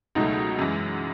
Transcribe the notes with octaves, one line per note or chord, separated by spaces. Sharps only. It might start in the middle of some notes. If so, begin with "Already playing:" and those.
C#2 B2 F#3 A3 D#4
F#2 E3 G#3